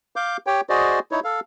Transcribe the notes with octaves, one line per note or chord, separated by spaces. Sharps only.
F5 D6 G6
G4 C#5 G5
F#4 G#4 C5 D5 D#5
D#4 E4 C#5
A4 F5